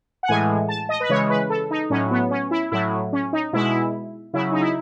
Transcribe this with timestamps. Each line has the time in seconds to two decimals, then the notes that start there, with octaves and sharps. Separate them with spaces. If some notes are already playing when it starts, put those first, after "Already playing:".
0.23 F#5
0.28 A2 E3 G#3 G#5
0.68 A5
0.89 D#5
1.00 B4
1.09 C#3 E3 G#3 C#5
1.30 B4
1.50 A4
1.71 D#4
1.90 A2 F#3 C#4
2.11 B3
2.31 C#4
2.51 E4
2.72 A2 F#3 E4
3.13 C#4
3.33 D#4
3.53 B2 G#3 E4
4.33 C#3 F#3 E4
4.52 D#4
4.61 E4